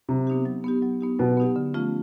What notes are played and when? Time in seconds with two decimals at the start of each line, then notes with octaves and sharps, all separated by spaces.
0.09 C3 F#3
0.27 B3 D#4 G4
0.46 F#3
0.64 B3 D#4 G4
0.82 F#3
1.01 B3 D#4 G4
1.19 B2 F#3
1.37 B3 D#4 G4
1.56 D3
1.74 F3 A3 C#4 F4